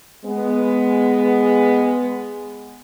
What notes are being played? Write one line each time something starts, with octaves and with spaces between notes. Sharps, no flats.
G#3 B3